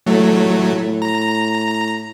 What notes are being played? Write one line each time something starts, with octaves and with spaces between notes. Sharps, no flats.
A2 F#3 A3
A#5